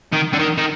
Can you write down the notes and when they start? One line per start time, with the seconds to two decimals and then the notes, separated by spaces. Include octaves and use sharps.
0.12 D#3
0.33 D3
0.39 D#3
0.57 D#3